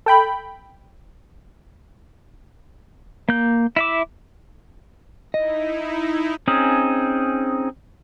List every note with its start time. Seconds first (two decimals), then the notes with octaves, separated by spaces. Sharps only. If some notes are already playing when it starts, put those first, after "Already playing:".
0.06 A4 G5 B5
3.29 A#3 G6
3.76 E4 E5 D6
5.34 D#4 E4 D#5
6.48 C4 C#4 D#4 G#4